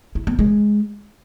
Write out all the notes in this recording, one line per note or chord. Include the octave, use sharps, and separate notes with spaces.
E4
B3
G#3